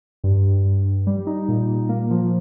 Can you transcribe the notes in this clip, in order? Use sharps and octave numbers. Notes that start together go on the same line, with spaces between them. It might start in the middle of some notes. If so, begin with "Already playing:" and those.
G2
G2
G2
G2
G3
D#4
A#2
A#2
A#3
F3